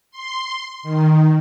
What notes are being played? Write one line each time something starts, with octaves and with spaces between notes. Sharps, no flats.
C6
D#3